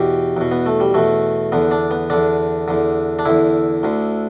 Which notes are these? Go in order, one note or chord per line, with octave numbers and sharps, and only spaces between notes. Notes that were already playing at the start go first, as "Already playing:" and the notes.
Already playing: E2 B2 G4
E2 B2
B3
A3
G3
E2 B2 A3
E2 D3 B3
D4
B3
E2 D3 D4
E2 D3
D4
E2 D3 E4
D2 D3